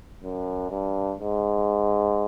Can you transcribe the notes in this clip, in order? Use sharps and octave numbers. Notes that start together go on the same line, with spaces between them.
F#2
G2
G#2